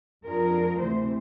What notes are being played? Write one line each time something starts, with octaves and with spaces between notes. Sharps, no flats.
F2 D4 F4 G#4 A#4
D2 C3 E3 C5